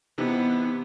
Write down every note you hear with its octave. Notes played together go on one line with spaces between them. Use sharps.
C3 E3 B3 D#4